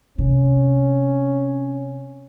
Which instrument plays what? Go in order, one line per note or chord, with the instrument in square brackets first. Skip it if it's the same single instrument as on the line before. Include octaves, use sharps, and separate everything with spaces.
[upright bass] C3 [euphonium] C#4